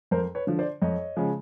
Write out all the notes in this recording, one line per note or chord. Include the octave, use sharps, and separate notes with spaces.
F2 A#4 C5
B4 C#5
D3 F3
C5 D5
F2 C#5 D#5
C#3 F3 G#3